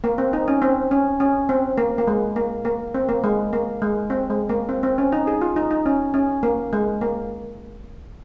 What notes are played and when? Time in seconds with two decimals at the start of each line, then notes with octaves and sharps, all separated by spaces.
0.04 A#3
0.18 C4
0.33 D#4
0.48 C#4
0.62 C4
0.91 C#4
1.20 C#4
1.49 C4
1.78 A#3
1.98 A#3
2.07 G#3
2.36 A#3
2.65 A#3
2.94 C4
3.09 A#3
3.24 G#3
3.53 A#3
3.82 G#3
4.10 C4
4.30 G#3
4.49 A#3
4.69 C4
4.83 C4
4.98 C#4
5.12 D#4
5.27 G#4
5.41 F4
5.56 D#4
5.71 D#4
5.86 C#4
6.14 C#4
6.43 A#3
6.73 G#3
7.01 A#3